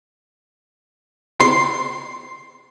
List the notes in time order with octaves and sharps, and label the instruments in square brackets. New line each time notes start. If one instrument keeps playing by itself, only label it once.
[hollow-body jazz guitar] C6